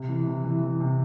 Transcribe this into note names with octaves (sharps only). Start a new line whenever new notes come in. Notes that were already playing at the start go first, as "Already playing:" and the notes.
Already playing: C3
E3
C3
E3
E3
C3